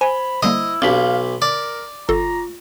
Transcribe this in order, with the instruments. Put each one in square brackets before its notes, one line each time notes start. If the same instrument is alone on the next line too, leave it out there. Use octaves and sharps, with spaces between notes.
[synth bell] C5 [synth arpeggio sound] G#5 [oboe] B5
[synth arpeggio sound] D3 G3 A#3 [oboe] E4 [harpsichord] D#5
[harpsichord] B1 [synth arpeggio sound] C4 D4 G4 [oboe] F5 [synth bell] B6 F#7 G7
[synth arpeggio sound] D3 [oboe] A#4 [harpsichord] D5
[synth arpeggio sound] G1 A4 C6 [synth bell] F4 [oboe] A#5